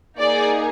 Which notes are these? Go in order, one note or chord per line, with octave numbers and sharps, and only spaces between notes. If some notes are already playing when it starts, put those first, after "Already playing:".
A#3 D#4 G#4 D5